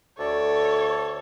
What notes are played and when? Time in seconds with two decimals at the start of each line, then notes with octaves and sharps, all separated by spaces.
0.19 D2 A4 C#5 D5